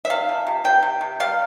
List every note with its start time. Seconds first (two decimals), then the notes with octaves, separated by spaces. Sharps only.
0.05 E5
0.10 C3 F5
0.29 F3
0.47 C3
0.64 C3 G5
0.83 C3
1.01 C3
1.20 G3 F5